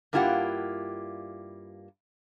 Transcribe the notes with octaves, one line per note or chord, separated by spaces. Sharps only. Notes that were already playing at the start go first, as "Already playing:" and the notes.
G2 A#3 E4 F4 G4 F#5